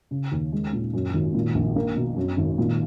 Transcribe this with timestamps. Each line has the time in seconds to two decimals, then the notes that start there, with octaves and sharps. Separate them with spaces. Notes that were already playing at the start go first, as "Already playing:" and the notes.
0.11 C#3
0.32 D#2
0.53 G#3
0.73 A#2
0.93 F#2
1.14 G#1
1.35 A#2
1.55 A#1
1.76 A#3
1.96 B2
2.17 F#2
2.37 G#1
2.58 A#2